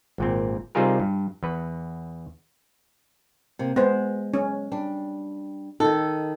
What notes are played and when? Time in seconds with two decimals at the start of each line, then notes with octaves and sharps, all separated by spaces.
0.18 G#1 A#2 C4
0.75 C3 G3 D#4 F4 G#4 A#4
1.00 G2
1.43 E2 B4
3.59 C3 A#3
3.76 G#3 B3 C5
4.34 C#4
4.72 G3 D4
5.80 D#3 D#4 A4